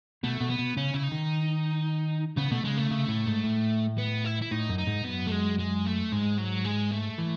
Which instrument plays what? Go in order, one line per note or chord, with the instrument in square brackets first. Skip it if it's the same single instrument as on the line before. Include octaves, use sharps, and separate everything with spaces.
[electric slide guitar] B2 [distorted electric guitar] A3
[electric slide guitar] B2
[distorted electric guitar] B3
[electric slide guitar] B2
[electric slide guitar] C#3 [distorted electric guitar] C#4
[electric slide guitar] C#3 [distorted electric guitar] E4
[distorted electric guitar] D#4
[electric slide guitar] D#3
[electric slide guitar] C#3 [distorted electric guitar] B3
[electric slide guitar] B2 [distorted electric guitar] A3
[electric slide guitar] C#3 [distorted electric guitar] G#3
[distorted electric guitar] A3
[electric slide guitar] C#3
A2
G#2
A2
[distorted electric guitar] B3
E4
E4
[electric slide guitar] A2 [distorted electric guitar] D#4
[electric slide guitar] F#2
[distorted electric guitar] D#4
[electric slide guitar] G#2
[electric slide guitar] F#2 [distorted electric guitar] B3
[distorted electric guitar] A3
G#3
G#3
A3
[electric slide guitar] G#2 [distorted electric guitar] G#3
[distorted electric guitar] F#3
G#3
A3
[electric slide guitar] E3